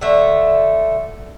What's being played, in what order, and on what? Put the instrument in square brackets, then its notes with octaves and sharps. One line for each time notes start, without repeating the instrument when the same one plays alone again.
[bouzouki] D3 A3